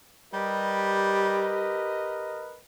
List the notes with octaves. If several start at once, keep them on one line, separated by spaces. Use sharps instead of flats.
G3 G4 A#4 B4 D#5